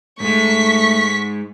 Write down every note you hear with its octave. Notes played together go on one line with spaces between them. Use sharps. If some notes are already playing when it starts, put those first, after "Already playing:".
G#2 G#3 A3 C#6 B6